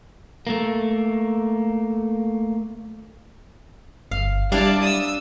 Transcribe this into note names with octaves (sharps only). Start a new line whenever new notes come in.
A3 A#3
G1 F5
G3 D4 E4 D5 F5 A5
D#6 E6